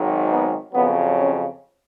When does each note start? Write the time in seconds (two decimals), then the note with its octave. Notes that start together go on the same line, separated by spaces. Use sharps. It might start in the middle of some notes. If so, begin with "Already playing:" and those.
Already playing: G#1 G#2 D#3 F#3
0.28 B3
0.73 F2 C#3 F#3 B3
1.18 C#4